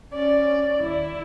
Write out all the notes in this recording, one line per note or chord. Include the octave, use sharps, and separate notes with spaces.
C#4 D5
D#1 E4